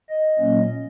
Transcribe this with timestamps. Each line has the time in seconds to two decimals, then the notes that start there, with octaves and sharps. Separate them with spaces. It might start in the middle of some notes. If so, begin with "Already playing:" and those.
0.10 D#5
0.39 A#2 F#3 A#3 C#4